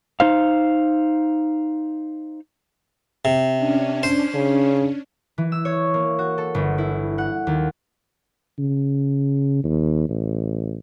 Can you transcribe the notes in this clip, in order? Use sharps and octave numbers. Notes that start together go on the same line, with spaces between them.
D#4 C5 F5
C3
C#4 D4
C5
C#3
E3
E6
C#5
A#3
F#4
A4
G1
E4
F#5
D#2
C#3
D#2
A1